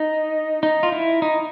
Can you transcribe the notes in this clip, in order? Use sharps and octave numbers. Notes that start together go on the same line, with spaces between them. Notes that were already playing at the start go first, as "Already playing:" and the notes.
Already playing: D#4
D#4
F4
E4
D#4